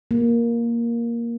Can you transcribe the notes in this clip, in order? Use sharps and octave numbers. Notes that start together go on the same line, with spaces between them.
A#3